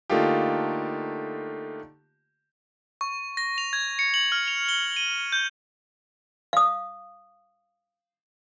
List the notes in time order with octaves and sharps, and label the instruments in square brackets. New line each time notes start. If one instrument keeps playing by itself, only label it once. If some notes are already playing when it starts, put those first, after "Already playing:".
[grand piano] D3 A3 A#3 D#4 F4 G4
[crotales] C#6
A#6
F7
G#6
C#7
F#7
F6
F7
G7
D#7
G6
[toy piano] F5 D#6